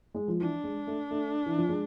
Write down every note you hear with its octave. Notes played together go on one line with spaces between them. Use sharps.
G#3
F3
E3 D4
G#3
A3
A3
E3
F3
G#3